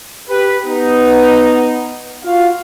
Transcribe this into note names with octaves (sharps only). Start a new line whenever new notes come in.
G4 B4
B3 D#4
F4 F#4 F5